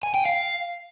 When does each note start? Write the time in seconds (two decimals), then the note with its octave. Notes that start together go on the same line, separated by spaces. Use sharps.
0.03 G#5
0.14 G5
0.25 F5